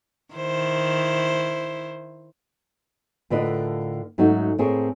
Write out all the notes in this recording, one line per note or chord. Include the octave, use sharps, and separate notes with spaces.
D#3 E4 C5
A2 D3 F4 A#4 B4 D#5
G#2 F#3 A3 C#4 D#4 F#4
A2 C4 E4 G#4 A#4 C#5